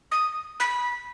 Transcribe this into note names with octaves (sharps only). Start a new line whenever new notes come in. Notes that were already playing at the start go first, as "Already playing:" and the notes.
D#6
B5